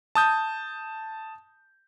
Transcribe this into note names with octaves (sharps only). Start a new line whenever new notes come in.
A5 D#6 G6